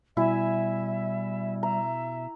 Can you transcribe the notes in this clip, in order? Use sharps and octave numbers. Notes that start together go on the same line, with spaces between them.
B2 G3 E4 E5 G#5
E5 A#5